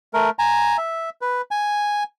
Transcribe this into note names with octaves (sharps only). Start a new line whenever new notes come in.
A3 A#4
G#5 A#5
E5
B4
G#5